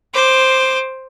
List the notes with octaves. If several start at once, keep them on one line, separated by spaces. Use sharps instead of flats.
C5 D6